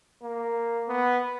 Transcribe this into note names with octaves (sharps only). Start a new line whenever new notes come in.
A#3
B3